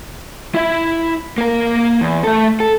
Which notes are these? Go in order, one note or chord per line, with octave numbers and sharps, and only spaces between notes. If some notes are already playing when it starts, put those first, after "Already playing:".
E4 E5
A#3 A#4
E2
A3 A4
A4